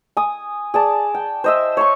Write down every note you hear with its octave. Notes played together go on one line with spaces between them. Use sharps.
G#5 D#6
G#4 D5 A5
G5
C5 D#5 E5
C#5 C6 C#6